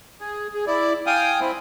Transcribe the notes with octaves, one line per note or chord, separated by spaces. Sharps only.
G#4
G#4
E4 D5
F5 G5 G#5 D#6
C4 E4